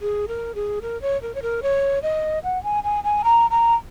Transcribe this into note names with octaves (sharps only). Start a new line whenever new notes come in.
G#4
A#4
G#4
A#4
C#5
A#4
C#5
A#4
C#5
D#5
F#5
G#5
G#5
G#5
A#5
A#5